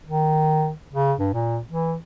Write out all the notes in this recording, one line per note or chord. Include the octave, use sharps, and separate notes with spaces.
D#3
C#3
G2
A#2
E3